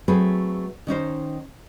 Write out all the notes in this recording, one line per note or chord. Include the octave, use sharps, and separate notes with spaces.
F#3 A3 C4 G#4 B4
D#3 C#4 D#4 C5